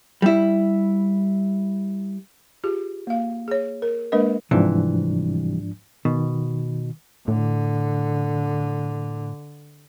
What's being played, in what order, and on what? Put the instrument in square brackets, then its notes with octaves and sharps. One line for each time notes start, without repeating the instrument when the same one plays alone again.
[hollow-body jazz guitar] G3 E4
[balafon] F4 G4 G#4
A#3 F5
G#4 C#5
A#4
G#3 A#3 D4 A#4 B4 D#5
[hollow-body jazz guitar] C2 C3 E3 [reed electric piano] G#2 F3 D4
[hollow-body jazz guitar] B2 [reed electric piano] D#3
[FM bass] A2 [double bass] D3